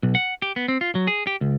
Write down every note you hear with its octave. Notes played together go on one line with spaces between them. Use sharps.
B1
F#5
G4
B3
C4
F4
F#3
G#4
G4
C#2